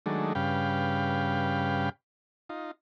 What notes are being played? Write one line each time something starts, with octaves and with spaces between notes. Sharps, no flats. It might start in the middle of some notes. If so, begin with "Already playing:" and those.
D#3 F#3 G#3 A3 D4
G2 C#3 B4 F5 G5
D#4 F4